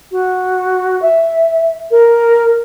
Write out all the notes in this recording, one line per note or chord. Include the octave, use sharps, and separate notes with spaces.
F#4
E5
A#4